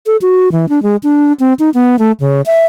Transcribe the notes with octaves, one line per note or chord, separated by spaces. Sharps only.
A4
F#4
E3
D4
G#3
D4
C4
D#4
B3
A3
C#3
E5